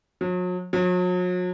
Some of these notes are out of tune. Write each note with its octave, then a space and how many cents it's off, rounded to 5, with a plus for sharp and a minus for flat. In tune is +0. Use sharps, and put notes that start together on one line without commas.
F#3 -40
F#3 -40